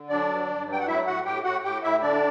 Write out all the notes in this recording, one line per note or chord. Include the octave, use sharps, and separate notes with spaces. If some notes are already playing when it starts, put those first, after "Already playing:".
Already playing: D3
F#3 D4 D5
G2
G2
F#3
G5
F#5
A2 E4 E5
A2 F#4 F#5
A2 G4 G5
A2 F#4 F#5
A2 G4 G5
A2 E4 E5
D3 D4 D5